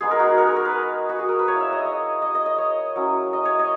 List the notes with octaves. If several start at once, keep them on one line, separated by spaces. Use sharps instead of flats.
G#3 B3 D#4 G#4
A#4
F#4
A#4
G#4
A#4
B4
F#4
G#4
A#4
B4
A#3 C#5
E4
E5
D#5
D#5
D#5
D#5
D#5
C#5
F#3 C#4 E4
D#5
C#5
D#5